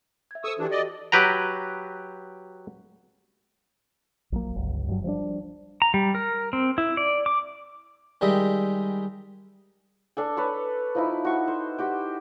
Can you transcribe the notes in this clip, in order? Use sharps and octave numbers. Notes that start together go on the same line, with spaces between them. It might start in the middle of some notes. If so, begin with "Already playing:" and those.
E5 G#6
A4 C5 C#6 D#6 E6
E3 D4 F#4 G4
D5 D#5
F#3 G4 B4 G5 A#5
A#1 F#3 A#3
G1 C#2
G2 F#3
F3 G3 C4 D4
A#5
G3
A#4
C4
E4
D5
D6
D#3 G3 G#3 D#5 E5
D4 A4 G#5
B4 C#5 A5
F3 D#4 E4
F#4 C#6
C5
F#4 G4 G5